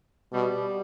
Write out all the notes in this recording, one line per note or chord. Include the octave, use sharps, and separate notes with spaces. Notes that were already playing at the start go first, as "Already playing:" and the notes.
B2 G3